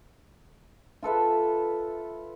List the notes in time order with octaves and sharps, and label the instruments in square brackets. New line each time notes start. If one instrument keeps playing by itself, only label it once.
[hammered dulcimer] F4 A4 B4 E5